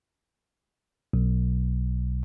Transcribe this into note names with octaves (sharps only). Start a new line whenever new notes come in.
B1